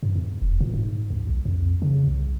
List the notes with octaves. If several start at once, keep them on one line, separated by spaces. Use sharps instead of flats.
G2
E2
E1
A#2
G#2
D2
B1
F2
C#3
C2